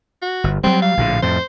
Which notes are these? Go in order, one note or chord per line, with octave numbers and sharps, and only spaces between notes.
F#4
G1
F#3 G3 C4
F5
A#1 A2 D3
F2 A2 C5